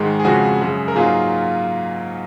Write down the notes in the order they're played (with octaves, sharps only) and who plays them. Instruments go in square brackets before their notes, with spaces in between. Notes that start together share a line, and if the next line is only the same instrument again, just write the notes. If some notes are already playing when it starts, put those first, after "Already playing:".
Already playing: [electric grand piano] G#2 D#3 G#3
G#4
F2 C#3 F3 G#3 F#4
F#2 C#3 G#3
A#4
G#2 F#3 A#3 F4 G#4